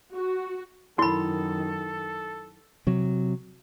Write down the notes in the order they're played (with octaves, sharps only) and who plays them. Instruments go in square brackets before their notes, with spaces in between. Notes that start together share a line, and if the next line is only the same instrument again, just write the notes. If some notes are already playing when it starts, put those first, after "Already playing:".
[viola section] F#4
[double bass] F#2 D#3 [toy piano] E4 B5 [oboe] A4 [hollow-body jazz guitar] C6
[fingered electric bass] C3 F#3